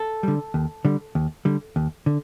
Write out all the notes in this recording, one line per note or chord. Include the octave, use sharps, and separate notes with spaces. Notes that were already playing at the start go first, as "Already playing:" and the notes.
Already playing: A4
D3 G3
D#2
D3 G3
D#2
D3 G3
D#2
D3